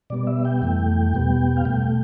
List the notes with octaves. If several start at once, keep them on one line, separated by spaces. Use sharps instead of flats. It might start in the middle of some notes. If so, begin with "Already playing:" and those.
B2 G3 B3 D5
E5
G5
F2 E3 A3
E2 B2 G3 B3
F5
B2 A3 G5